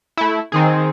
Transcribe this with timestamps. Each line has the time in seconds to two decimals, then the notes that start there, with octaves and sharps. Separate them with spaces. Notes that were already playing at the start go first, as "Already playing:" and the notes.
0.17 A3 E4
0.52 D#3 C4 D#4 G#4